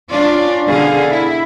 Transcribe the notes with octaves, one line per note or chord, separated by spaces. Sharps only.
C#4 D4 F4 D5
B2 D3 G#4 F5
E4